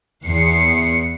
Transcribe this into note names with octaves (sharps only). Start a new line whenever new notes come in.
E2 C7 C#7